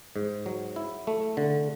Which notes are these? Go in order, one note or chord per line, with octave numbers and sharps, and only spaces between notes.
G#2
F#3
E4
A3
D3